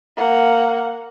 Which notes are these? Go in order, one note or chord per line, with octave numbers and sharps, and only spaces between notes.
A#3 F#5